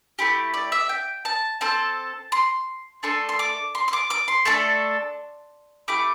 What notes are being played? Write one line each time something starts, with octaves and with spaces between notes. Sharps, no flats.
A3 E4 G4
D5
E5
G5
A5
C4 A4 A5
C6
A3 D4 A4 C6
C6
D6
C6
C6
D6
D6
C6
A3 D4 A4
A3 E4 G4 D6